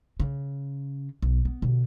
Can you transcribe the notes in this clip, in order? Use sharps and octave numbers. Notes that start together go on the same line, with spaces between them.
C#3
B1
B3
B2 D3